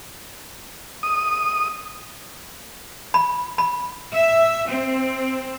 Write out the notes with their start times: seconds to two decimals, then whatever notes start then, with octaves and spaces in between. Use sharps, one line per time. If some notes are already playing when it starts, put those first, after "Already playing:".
1.03 D#6
3.14 B5
3.58 B5
4.11 E5
4.67 C4